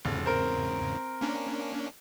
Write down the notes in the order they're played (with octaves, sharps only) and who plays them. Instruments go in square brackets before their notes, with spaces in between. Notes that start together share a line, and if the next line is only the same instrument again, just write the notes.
[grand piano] F1 [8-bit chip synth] E2 G#2 C#3
[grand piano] C4 A#4
[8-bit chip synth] A#3 C#4 D4